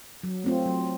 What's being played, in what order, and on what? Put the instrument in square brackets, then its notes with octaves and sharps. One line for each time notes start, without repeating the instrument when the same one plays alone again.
[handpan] F#3
A3 C4 F4
F#3